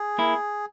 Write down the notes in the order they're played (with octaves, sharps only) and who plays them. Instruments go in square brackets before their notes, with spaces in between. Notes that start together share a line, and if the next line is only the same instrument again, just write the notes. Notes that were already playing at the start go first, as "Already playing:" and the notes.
Already playing: [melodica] G#4
[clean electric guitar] A#3 E4